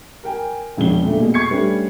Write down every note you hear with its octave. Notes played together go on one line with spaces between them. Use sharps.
A#4 G5 G#5
E1 C#3 F3 C#4 D4 G7
A#2 D3 A3
B2 G#4
C#6 G#6 C7 C#7
G3 A3 C#4 D4 B4